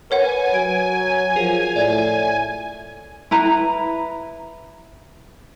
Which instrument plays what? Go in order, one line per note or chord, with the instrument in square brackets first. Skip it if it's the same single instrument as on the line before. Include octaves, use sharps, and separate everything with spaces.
[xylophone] A#4 C#5 F#5 [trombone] B4 [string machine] G#5
[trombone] F#3 [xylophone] D7
[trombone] F3 [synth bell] F4 G#4 A#4
[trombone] A2 [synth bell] D5 E5
[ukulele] E4 B4 A#5